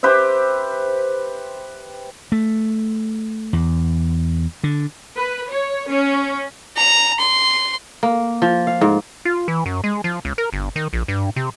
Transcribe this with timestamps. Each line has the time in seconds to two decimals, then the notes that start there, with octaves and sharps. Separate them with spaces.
0.03 G4 B4 C5 E5
2.32 A3
3.53 E2
4.64 D3
5.16 B4
5.49 C#5
5.88 C#4
6.77 A#5
7.20 C6
8.03 A#3
8.42 F3
8.67 F5
8.81 G#2
9.25 F4
9.48 E3
9.66 F#2
9.84 G#3
10.04 F3
10.25 C#2
10.38 A#4
10.53 G1
10.76 D#3
10.93 A#1
11.08 G2
11.36 C3